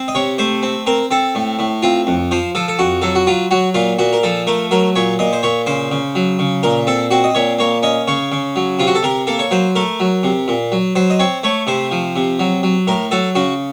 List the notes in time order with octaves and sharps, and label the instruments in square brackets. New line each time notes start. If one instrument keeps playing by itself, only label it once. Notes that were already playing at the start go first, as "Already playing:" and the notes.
Already playing: [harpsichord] C4
D#5
C3 C#5
A3 C5
C4
C4 A#4
C4 A4
A2
A2
C4 F4
F2
F3 C5
F3 A4
A4
F2 F#4
F#3 A4
F#4
F#3 F4
F#3 F#4
A#2 F4
A#2 F#4
A#4
F3 A4
A3 A#4
F#3 A#4
A#2 C#5
A#2 D#5
C5
A#2 C#5
C#3 C5
C#3
F#3
C#3
A#2 A#4
C4 A4
C4 F#4
D#5
A#2 C#5
A#3 C#5
C#4 D#5
C#3 C#5
C#3
F#3
C3 F4
F#4
A4
C3 A#4
A#3 A4
C#5
F#3 C5
A3 A#4
F#3
C3
A#2
F#3
F#3 C5
D#5
C4 C#5
A3 C#5
C3 C5
F3
C3
F#3
F#3
A2 A#4
F#3 A4
C#3 F#4